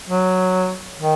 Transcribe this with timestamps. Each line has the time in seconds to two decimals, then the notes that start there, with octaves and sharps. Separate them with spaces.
0.09 F#3
0.99 D#3